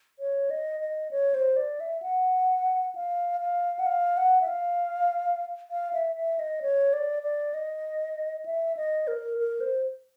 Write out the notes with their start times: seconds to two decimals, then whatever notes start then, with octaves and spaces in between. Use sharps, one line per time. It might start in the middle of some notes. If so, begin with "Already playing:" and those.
0.19 C#5
0.50 D#5
0.80 D#5
1.11 C#5
1.34 C5
1.56 D5
1.80 E5
2.02 F#5
2.95 F5
3.40 F5
3.79 F#5
3.86 F5
4.17 F#5
4.41 E5
4.48 F5
5.71 F5
5.93 E5
6.16 E5
6.39 D#5
6.62 C#5
6.93 D5
7.23 D5
7.54 D#5
8.46 E5
8.77 D#5
9.08 A#4
9.38 A#4
9.60 C5